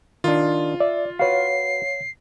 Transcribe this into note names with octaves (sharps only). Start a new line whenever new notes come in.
D#3 D4 F4
D5 E5
F#4 B4 C#5 F5 C7